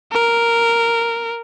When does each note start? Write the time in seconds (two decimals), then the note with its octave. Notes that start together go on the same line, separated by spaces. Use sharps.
0.12 A#4